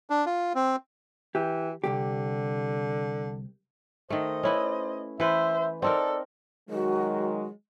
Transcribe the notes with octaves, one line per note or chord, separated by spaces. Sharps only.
D4
F4
C4
E3 G4
C2 F#2 D3 G4
D#3 A3 C5 D#5
C#4 E4 B4
E3 B4 C5 E5
C4 D#4 A4 A#4 D5
D#3 F#3 G#3 F#4